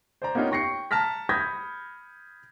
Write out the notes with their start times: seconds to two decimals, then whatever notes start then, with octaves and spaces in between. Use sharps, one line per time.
0.22 C5 D5 A#5
0.35 A#3 B3 C#4 D#4 F4 G4
0.51 G5 C#6 A#6 C7 C#7
0.91 A5 A#5 F6 A#6 B6
1.29 B5 D#6 G6 G#6 A#6 B6